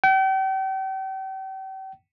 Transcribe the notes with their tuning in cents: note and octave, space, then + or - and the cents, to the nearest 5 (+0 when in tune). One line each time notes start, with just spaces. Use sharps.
G5 -40